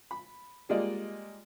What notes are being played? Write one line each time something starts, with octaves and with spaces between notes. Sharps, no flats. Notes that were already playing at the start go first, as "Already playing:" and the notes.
B5
G3 G#3 A#3 F4 D5 D#5